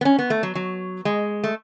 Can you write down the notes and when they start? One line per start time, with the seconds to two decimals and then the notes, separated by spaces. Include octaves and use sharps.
0.01 B3
0.05 C#4
0.19 B3
0.30 A3
0.43 F#3
0.55 F#3
1.05 G#3
1.44 A3